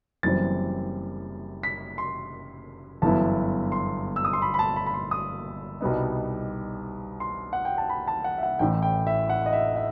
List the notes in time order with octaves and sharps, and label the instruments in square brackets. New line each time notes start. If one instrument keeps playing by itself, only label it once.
[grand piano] F#1 F#2 E3 G3 C4 A6
B6
C6
G1 F#2 E3 B3 E4 A5
C6
E6
D#6
C6
B5
B5
A5
B5
B5
C6
D#6
C2 B2 G3 B3 D#4
C6
F#5
G5
A5
B5
A5
F#5
E5
F#5
A1 A2 E3 G5
G5
E5
F#5
D#5
E5
E5